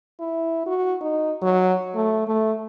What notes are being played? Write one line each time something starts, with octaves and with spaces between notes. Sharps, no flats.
E4
F#4
D#4
F#3
A3
A3